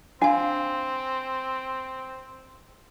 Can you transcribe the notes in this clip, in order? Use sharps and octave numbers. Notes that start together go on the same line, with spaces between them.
C4 D4 F5 G#5